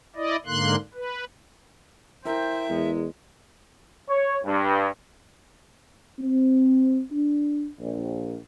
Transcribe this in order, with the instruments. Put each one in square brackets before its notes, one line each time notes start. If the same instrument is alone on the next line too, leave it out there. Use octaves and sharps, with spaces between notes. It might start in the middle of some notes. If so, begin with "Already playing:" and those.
[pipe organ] E4 D5 D#5
G#2 D3 A#3 C6 F#6
B4
[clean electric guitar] E4 A#4 [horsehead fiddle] C5 G5 [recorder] E5
[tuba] E2 [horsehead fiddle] G#3
[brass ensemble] C#5
G2
C4
D4
A#1